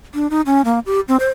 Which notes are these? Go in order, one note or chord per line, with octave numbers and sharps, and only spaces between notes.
D4
D#4
C#4
A#3
G4
C4
C5